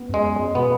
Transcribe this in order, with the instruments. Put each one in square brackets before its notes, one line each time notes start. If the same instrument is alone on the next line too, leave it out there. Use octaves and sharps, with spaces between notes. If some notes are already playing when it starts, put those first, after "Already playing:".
Already playing: [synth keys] B3
[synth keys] F#2 [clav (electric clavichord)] G#3
[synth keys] F#2
F#2
[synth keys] B2 [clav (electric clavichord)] B3